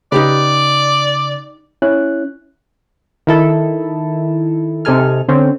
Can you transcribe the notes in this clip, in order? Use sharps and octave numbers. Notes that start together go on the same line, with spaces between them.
C#3 D#4 G4 B4 D5
C#4 E4 F#6
D#3 E4 A4
C3 D#4 A4 G#5 F6
D3 C4 C#4